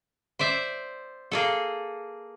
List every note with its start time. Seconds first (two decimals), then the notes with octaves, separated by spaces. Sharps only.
0.39 C5 D5 E5
1.31 A#3 G#4 A4